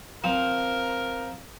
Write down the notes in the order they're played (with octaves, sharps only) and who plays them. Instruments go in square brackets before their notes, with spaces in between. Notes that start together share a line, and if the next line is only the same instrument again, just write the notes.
[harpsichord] F3 C4 [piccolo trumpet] A#4